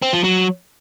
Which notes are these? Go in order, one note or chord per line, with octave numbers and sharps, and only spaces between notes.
C4
F3
F#3